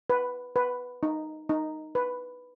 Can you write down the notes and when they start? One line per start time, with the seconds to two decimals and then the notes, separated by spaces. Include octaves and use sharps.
0.10 B4
0.56 B4
1.03 D#4
1.49 D#4
1.95 B4